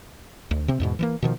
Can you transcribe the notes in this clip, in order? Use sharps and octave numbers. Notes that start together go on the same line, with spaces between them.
D2
C3 C4
E2 G#2 B2
E3 F#3 A#3
B2 D#3 F3